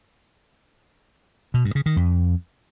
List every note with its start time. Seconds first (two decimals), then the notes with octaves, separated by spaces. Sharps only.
1.54 B2
1.65 G2
1.75 C#3
1.86 D#3
1.96 F2